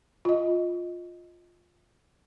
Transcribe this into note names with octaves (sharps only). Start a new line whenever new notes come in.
F4 D#5